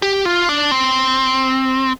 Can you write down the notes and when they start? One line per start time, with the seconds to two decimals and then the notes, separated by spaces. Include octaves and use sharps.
0.02 G4
0.25 F4
0.49 D4
0.71 C4